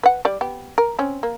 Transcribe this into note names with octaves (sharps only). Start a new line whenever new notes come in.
B4 F#5
G3 D5
B3 G4
A#4
C4 C#4
A#3